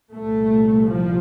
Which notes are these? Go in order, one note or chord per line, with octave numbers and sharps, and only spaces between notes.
C2 A#2 A3
F3